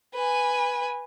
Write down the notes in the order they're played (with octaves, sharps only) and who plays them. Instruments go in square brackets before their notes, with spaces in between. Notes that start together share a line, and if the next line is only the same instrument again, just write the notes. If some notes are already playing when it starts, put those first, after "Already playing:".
[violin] B4 G#5